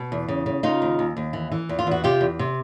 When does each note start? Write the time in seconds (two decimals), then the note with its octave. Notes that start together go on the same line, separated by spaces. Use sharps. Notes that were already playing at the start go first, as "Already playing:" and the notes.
Already playing: B2
0.12 E2
0.28 C#3
0.46 C#3
0.63 C#3 D#4 F4
0.82 D#2
0.99 D#2
1.17 D#2
1.33 E3
1.52 E3
1.69 E2
1.79 F4
1.87 E2 F#4
2.04 C3 F4 G4
2.21 E2
2.39 C3